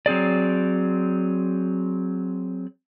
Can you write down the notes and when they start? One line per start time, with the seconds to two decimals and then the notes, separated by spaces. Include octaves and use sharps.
0.06 F#3 C4 G#4 D5